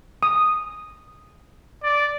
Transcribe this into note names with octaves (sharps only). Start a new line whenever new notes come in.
D#6
D5